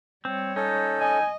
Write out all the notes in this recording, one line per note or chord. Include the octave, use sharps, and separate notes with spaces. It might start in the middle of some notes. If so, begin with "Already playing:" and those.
G3 C4 C#5
C#4 D#4 A4
D#5 G#5